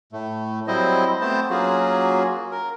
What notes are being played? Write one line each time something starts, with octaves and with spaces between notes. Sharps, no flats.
A2 A3
F#3 G3 C4 E4 C5 D#5
A3 B3 C4 C5 A5
F#3 A#3 C#4 F4 F#4 G#4
A#4